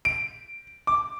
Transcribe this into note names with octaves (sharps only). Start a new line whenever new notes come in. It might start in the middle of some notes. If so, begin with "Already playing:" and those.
D7
D6